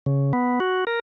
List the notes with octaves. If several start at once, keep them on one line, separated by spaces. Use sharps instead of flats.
C#3
B3
F#4
A#4